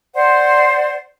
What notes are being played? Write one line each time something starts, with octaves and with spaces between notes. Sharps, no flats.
C5 D5 F#5 C6